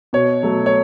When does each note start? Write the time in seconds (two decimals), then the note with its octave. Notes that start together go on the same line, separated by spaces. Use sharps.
0.13 B2 C#5
0.43 F#3 A3
0.66 C#5